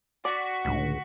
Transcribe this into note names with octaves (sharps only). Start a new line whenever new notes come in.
F#4 D5 B6
C#2 A2 D3